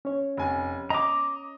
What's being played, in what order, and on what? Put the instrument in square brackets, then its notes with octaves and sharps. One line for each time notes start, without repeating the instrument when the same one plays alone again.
[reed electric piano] C#4 C#5
[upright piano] F1 G#5
[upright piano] D#5 [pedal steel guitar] A#5 D6